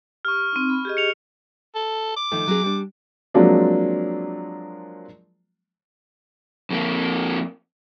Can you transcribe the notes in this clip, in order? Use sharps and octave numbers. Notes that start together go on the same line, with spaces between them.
G4 C#6 F6
C4 D#4
B5
G4 G#4 D#5
C#7 F7
A4
D6
D#3 F3 A3
F#3 C#4 G#4
G3 D4
F3 F#3 G#3 A#3 C4 D4
F2 A#3